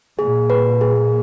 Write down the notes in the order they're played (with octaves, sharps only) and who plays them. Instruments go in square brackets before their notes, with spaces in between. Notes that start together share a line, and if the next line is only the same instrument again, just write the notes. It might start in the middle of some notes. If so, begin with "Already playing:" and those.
[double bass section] A#2 [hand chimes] G#4
[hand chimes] B4
G#4